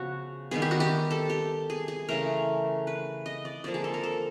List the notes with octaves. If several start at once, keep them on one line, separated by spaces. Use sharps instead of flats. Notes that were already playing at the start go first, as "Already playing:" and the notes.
Already playing: C#3 F3 B3 F#4
D#3 G3 B3 G#4
G4
F#4
G4
A4
G4
G#4
G#4
C#3 E3 A3 A#4
B4
D#5
D5
D3 F3 A#3 D5
G#4
A4
A#4
A4